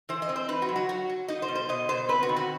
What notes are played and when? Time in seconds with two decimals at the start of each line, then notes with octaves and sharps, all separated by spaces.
0.09 E3 C5
0.22 D#5
0.29 C4
0.36 C5
0.49 D#4 B4
0.62 F#4
0.69 F#3
0.76 F#4
0.89 F#3 F#4
1.09 F#3
1.28 D#4 D#5
1.42 C5
1.48 B2
1.55 C5
1.69 B2 D#5
1.89 B2 C5
2.09 C4 B4
2.23 F#4
2.29 D#3
2.36 F#4